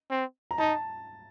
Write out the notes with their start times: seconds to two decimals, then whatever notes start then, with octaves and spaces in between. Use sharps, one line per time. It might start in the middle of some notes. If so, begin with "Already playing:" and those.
0.10 C4
0.51 A#5
0.58 D#4 A5